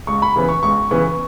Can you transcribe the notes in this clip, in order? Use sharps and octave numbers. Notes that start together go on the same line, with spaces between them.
C#2 C#6
B5
C#3 E3 B3
C#6
C#2 C#6
C#3 E3 B3